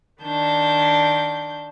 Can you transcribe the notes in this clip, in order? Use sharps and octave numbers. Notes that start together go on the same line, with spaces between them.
D#3 D4 G6